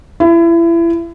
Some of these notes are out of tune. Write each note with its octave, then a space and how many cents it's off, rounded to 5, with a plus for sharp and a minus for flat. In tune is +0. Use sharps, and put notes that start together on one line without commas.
E4 +30